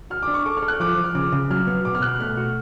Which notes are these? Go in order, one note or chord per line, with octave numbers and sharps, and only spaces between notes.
F#4 F6
D4 D6
C#6
A4 D6
F6
A4
F#6
F3 D6
F3
F6
C#3 D6
C#3
F#3 F6
B3
B2 D6
F6
B2 F#6
A3 F6
F#4